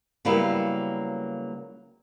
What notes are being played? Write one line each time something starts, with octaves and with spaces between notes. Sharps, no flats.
C#3 F#3 G3 A#3 B3 E4